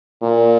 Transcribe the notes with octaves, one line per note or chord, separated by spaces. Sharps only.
A#2